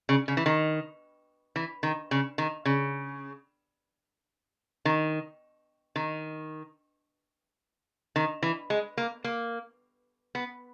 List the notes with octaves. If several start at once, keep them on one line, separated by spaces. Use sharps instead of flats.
C#3
C#3
E3
D#3
E3
D#3
C#3
D#3
C#3
D#3
D#3
D#3
E3
G#3
A#3
A#3
B3